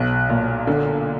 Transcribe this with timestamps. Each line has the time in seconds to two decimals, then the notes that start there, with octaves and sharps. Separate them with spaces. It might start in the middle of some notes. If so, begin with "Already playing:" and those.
Already playing: B1 F#6
0.29 A#2
0.67 D3